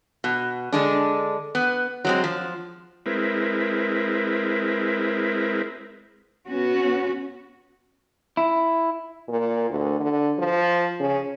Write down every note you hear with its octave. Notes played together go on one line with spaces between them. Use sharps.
B2
D3 G#3 D4
B3
F#3 G#3 C4
F3
G#3 C4 E4 A#4 B4
B3 C#4 F#4
E4
A#2
D2
D3
F3
C#3